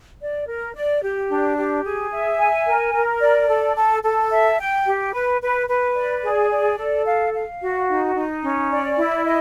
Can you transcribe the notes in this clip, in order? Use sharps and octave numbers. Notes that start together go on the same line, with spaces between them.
D5
A#4
D5
G4
D4
G4
G#4
E5
G#5
A#4
A#4
D5
A4
A4
A4
E5
G5
G4
B4
B4
B4
D5
G#4
D5
A4
F5
F5
F#4
D#4
D#4
C#4
D5
E4
D#5